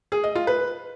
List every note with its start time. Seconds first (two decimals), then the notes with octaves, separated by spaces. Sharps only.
0.12 G#4
0.24 D#5
0.35 F4
0.47 B4